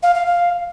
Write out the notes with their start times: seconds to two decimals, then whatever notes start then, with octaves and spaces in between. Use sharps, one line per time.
0.03 F5
0.15 F5
0.26 F5